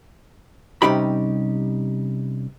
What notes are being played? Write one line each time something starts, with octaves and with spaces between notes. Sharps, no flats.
C3 G3 C#4 D#4 G4 B5